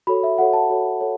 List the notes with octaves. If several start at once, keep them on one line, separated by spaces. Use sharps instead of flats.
F#4 A4 C#5 B5
E5
F#4 A4 C#5 F#5
A5
F#4 A4 C#5
A4 C#5